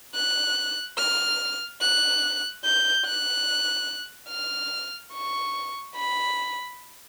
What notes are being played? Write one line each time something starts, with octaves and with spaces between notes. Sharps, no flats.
F#6
F6
F#6
G6
F#6
F6
C#6
B5